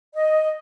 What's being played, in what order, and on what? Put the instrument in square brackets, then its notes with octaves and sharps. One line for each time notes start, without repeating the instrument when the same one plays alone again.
[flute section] D#5